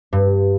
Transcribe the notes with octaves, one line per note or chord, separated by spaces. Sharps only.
G2